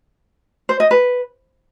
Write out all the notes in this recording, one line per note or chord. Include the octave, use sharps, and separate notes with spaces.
C5
D#5
B4